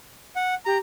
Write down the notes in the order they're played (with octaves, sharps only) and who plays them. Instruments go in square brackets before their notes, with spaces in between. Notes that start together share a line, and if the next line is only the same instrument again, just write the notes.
[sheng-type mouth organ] F#5
[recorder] G4 [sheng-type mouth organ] A#5